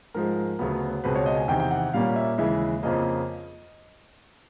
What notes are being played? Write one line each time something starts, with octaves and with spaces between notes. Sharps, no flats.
G#2 F3 G#3 A#4
D2 C#3 F#3 B3
C#2 B2 G#3 C4 B4
C#5
D#5
G#5
E2 C3 D#3 G5
G5
F#5
A#2 G3 A#3 C#4 F5
E5
D#2 C#3 E3 G#3 E5
F2 C#3 F3 A#3 D#5